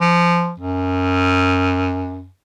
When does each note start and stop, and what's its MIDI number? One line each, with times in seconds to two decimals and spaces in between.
0.01 0.53 53
0.59 2.28 42